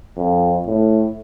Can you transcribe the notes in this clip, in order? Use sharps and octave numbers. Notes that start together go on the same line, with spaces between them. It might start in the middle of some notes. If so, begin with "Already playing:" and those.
F2
A2